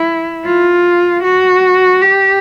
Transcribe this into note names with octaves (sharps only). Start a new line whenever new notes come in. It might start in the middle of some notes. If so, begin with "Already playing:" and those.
Already playing: E4
F4
F#4
G4